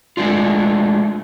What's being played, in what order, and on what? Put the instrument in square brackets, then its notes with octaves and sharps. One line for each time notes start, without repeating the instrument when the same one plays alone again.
[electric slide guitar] G#3 A3 D4 F4